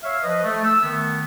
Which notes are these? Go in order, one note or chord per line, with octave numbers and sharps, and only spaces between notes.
C#5 E5 F5
F3 B4 D#5
A3
E6
D#3 A3 B3